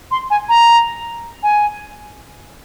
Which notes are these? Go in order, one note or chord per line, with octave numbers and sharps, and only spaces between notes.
C6
G#5
A#5
G#5